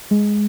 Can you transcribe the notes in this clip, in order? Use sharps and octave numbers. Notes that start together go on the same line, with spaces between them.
G#3